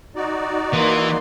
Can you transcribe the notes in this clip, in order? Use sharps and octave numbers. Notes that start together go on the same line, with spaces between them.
D#4 F#4 D5
E3 A#3 C6